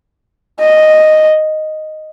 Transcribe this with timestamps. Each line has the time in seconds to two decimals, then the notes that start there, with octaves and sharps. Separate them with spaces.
0.60 D#5